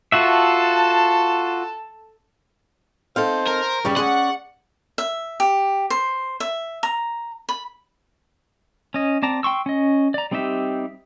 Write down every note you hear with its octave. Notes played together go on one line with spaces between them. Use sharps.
F4 F#4 A4 E5 A5
C4 D#4 A4 C5 F5
A#4
G2 C#3 G3 G4 B4 D5 C#6
C#4 G#4 F#5 C6
E5
G4
C5
E5
A#5
B5
C#4 D#5
C4 D5 A5 A#5
G5 C6 C#6 E6
C#4 D#5
D5 A#5
G3 C4 D#4 G4 E5